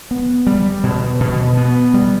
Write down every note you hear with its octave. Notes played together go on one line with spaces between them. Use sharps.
B3
G3
B2
B2
B3
G3